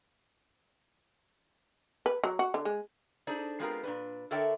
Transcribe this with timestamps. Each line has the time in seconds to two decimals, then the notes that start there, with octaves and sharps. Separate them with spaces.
2.06 B4
2.24 F#3
2.39 F#4
2.54 D3
2.65 G#3
3.27 D4 D#4 G#4 A4 C5 D5
3.60 G#3 B3 C4 F4 G4 A#4
3.84 A#2 D4 B4
4.31 D3 A4 A#4 C#5 E5 G5